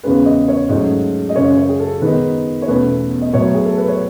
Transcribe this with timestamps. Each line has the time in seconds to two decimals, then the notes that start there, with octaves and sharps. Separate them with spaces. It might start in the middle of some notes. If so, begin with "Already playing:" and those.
0.03 E2 C#3 G#3 C#4 B4
0.25 D#5
0.48 C#5
0.69 G#2 F#3 A3 C#4 D#5
1.29 D#5
1.36 F#2 C#3 G#3 C#5
1.57 C#5
1.69 G#4
1.80 A4
2.02 D#3 G#3 B3 D#4 B4
2.62 C#5
2.68 E2 B2 A3 C#4 B4
3.21 D#5
3.33 A2 F#3 B3 C#5
3.54 G#4
3.65 A4
3.77 B4
3.88 C#5